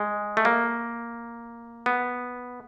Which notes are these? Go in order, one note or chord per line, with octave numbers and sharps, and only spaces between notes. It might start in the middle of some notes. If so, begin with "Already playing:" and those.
Already playing: G#3
A3
A#3
B3